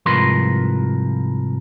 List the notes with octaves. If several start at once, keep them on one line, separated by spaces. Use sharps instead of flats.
C2 G#2 F3 A#4 B4 C6